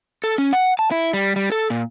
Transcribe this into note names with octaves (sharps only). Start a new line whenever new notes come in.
A4
C#4
F#5
A5
E4
G3
G3
A4
A#2